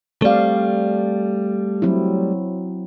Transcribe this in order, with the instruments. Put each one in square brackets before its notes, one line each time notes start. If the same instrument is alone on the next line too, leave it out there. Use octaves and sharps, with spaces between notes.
[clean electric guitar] G3 A3 [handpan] C4 D5 F5
[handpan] F#3 C4 E4